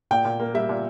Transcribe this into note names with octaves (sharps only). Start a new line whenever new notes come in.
A#2 G5
A#2
A#3
G3 E5
A#2